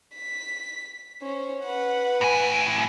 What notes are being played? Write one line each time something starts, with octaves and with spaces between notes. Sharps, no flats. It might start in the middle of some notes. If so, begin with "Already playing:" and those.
B6
C#4 C5
B4 F#5
A2 G#5